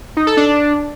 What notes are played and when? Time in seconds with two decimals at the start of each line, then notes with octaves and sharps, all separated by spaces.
0.17 D#4
0.27 A4
0.37 D4